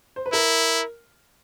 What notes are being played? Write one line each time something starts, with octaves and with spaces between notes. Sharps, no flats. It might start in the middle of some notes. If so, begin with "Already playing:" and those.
C5
B4
E4 A#4